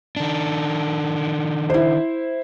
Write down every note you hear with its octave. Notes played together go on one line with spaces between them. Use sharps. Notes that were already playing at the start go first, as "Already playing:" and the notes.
D#3 D4
E4 C5